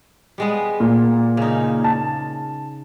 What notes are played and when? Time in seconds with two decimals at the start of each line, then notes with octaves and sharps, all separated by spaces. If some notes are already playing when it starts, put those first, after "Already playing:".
0.38 G3 G#3 B3
0.80 A#2
1.37 C#3 D#4
1.84 A5